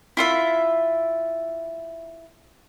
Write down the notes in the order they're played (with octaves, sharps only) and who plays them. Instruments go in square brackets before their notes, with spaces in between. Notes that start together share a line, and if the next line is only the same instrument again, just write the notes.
[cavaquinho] E4 F4 E5